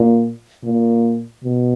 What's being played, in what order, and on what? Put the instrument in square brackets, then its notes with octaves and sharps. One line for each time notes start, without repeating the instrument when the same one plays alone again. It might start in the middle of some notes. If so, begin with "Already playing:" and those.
Already playing: [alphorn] A#2
A#2
B2